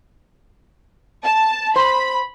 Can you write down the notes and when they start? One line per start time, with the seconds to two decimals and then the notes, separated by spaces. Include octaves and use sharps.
1.25 A5
1.76 C5 B5